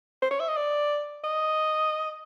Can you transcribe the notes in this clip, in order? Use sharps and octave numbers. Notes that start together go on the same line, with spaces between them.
C5
C#5
E5
D#5
D5
D#5